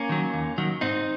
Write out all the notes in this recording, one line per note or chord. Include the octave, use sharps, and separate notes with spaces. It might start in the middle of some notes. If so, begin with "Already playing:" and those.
Already playing: A#3 C#4
D#3 F#3
D#2
D#3 F#3
G#2 C4 D#4